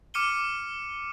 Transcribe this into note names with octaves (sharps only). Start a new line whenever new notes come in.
D6 F6 C#7 D#7 G7